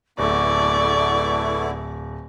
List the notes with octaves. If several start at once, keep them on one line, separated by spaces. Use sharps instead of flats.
D1 A3 B3 E4 D5 C#6